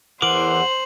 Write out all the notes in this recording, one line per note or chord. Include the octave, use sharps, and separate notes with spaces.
E2 E3 A#4 C5 F#5 D6 F#7